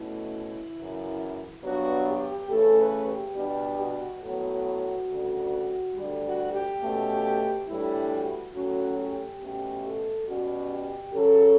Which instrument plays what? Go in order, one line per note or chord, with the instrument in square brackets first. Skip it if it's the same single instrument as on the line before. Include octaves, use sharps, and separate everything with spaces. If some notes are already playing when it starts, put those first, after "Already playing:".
Already playing: [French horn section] B2 A3 C#4 E4
F#2 C#3 E3
G2 F#3 B3 D4 F#4
G4
C#3 E3 A3 C#4 A4
B4
G4
B2 G3 B3 D4 G4
F#4
A2 F#3 B3 F#4
D2 C#3 G3
D2 D3 G3
F#4
G4
B2 A3 C#4
A2 E3 G3 D4 E4
F#4
A2 F#3 C#4 F#4
G4
B2 A3 C#4 G4
A4
B2 G3 C#4 F#4
G4
C#3 F#3 C#4 A4